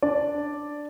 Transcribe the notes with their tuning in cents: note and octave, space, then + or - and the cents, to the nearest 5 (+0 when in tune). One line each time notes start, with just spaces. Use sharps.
D4 +0 D5 +0